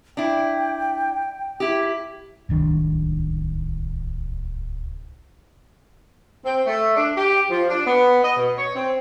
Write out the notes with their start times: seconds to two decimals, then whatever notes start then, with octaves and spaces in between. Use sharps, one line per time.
0.17 D4 E4 G5
1.60 E4 G4
2.49 D1 C2 D#3 D4
6.44 C4
6.66 A3
6.96 D4
7.16 G4
7.50 F3
7.68 D4
7.87 B3
8.23 D#5
8.36 B2
8.56 C#5
8.74 C4